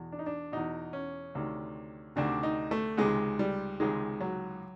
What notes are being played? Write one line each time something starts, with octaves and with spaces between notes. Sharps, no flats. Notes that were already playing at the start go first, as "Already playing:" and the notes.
Already playing: E2 B2
D4
D#4
D4
E2 B2 D#4
C#4
D2 C3 D#3
D2 C3 D#3 D4
D#4
A3
C#2 C3 D#3 G#3
G3
C#2 C3 D#3 G#3
F#3